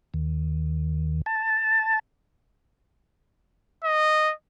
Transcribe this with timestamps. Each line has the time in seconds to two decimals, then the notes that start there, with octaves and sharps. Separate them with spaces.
0.14 D#2
1.26 A5
3.84 D#5